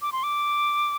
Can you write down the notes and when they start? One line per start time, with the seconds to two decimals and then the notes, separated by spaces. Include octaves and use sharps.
0.02 D6
0.12 C6
0.23 D6